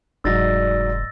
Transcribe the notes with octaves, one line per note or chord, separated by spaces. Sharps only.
F1 G#2 F#3 D5 E6 A6 A#6